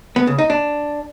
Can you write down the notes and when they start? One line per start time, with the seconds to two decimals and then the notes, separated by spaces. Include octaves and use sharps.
0.16 B3
0.27 C#3
0.38 D#4
0.50 D4